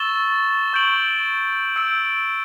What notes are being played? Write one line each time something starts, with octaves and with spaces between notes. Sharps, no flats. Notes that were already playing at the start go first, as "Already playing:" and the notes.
Already playing: C#6 E6 A6 E7 G7
C#6 G6 D7 F#7
E6 G6 D7